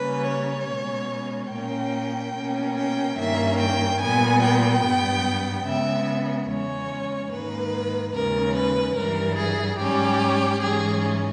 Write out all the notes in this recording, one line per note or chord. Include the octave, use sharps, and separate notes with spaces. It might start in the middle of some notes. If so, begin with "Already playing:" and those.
Already playing: C#3 G3 A#3 C#4 B4
C#5
B2 G#3 C#4
A#2 A#3 C#4 G5
B2 A#3 C#4
G5
G2 D#3 A#3 C#4 E5
G5
A#2 G3 B3 G#5
G5
G2 G3 B3
C#3 G#3 B3 E5
E2 C#3 G#3 C#4 C#5
G#2 D#3 A#3 B4
D#2 C#3 G#3 C#4 A#4
B4
G2 E3 G3 A#4
G#4
G#2 G3 C#4 G4
G#2 E3 G3 C#4 G#4